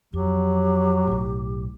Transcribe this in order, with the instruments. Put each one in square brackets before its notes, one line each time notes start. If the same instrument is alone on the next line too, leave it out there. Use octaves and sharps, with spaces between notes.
[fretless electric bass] F2 [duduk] F#3 [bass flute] G4
[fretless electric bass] B1 A2